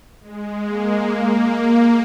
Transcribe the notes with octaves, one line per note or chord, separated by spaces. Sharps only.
G#3
A#3
A#3